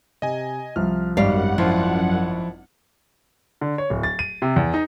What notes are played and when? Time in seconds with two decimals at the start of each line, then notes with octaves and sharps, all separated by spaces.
0.22 C3 D#5 G#5
0.76 C2 F3 F6
1.17 G#1 F#2 G3 D5 F5 F#5
1.58 F3 E4 F4
3.61 D3
3.78 C#5
3.90 D1
4.03 A6
4.19 D#7
4.42 C3
4.56 E2
4.74 D#4